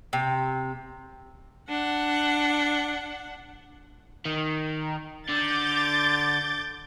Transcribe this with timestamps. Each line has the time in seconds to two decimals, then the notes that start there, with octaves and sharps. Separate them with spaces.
0.13 C3
1.69 D4 F#5
4.25 D#3
5.29 D3 D6 G6 A6